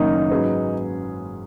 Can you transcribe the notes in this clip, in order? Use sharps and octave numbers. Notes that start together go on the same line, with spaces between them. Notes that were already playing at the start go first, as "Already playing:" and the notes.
Already playing: F#1 F#2 D#3 A#3 C#4 D#4
G#2 F#3 C#4 G#4 B4